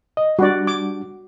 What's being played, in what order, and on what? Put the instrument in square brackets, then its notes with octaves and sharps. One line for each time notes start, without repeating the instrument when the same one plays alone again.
[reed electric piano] D#5
[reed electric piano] G3 D4 [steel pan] F#4 D5
[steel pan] D6